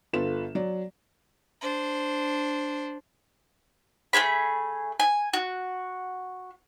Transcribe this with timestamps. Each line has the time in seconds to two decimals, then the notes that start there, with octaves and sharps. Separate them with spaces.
0.13 G1 F4 A4 B4 E7
0.55 F#3 D5
1.61 D4 C5
4.13 A3 C#4 G#4 B5
5.00 G#5
5.33 F#4